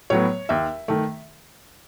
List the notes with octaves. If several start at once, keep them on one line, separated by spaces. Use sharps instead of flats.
A2 F#3 B3 C#5
D#2 E5
D#3 A3